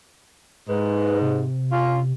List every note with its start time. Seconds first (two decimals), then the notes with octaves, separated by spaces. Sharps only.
0.69 G#2 B4
1.21 C3
1.71 C#4 F4